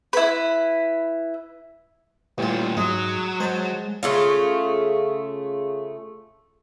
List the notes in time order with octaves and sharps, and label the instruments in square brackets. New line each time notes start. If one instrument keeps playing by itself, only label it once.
[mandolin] E4 B4
[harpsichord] A1 F4 [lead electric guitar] A#2 G3
[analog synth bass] G#2 [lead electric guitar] F#3 [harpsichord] G#3
[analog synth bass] G#3 [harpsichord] C5 A5
[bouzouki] C#3 A3 F4